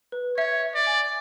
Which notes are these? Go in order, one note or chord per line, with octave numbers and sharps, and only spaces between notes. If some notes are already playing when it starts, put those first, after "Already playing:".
B4
C#5 E5
E5
D5
G#5